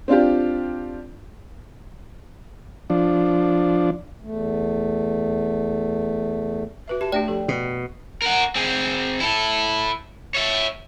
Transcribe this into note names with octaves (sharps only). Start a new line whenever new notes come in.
C4 D4 F4 G4
F3 D4
E2 A3
F#4 B4 E5
G4 E5 A5
A3 D4 G4 D5 G5
F3 A4
B2
A#4 F#5
C4 G#4
E4 A4
C#5 E5